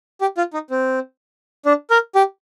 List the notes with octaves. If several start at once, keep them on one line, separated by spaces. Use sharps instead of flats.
G4
F4
D#4
C4
D4
A#4
G4